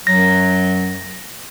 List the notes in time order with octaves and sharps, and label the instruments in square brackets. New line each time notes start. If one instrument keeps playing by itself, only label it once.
[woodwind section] F#2 F#3 [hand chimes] A#6